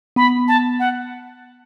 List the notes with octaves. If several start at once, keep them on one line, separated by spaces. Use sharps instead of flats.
B3 B5
A5
F#5